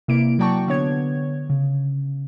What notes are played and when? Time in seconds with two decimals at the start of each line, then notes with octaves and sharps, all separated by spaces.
0.08 C3 A#3 E4 D7
0.39 F#3 F#4 D5 G5 A5 C#6
0.68 D3 B3 C#5 G#6
1.50 C#3